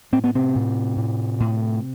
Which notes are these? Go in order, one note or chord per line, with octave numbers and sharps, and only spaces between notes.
A2 C4
B3
C3 C4
A2
A2
A2